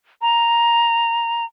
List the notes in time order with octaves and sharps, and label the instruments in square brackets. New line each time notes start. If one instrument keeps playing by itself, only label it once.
[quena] A#5